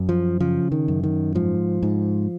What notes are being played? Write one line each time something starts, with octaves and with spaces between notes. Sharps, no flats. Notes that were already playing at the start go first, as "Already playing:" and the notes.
Already playing: F#2
F3
C#3 F3
D#3
F#2
D#3
G#2 F3
G#2